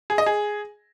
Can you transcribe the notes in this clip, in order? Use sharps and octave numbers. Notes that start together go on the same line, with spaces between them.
G#4
D#5
G#4